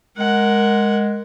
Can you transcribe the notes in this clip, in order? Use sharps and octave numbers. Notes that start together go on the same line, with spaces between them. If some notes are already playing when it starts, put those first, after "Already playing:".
G#3 A#4 F#5